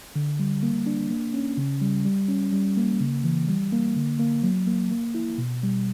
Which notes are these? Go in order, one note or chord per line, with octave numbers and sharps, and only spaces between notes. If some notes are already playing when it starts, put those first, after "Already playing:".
D3
G3
A#3
D4
A#3
C#4
C#3
G3
G3
C#4
G3
A#3
C#3
E3
G3
A#3
D3
A#3
F#3
A#3
A#3
E4
B2
G3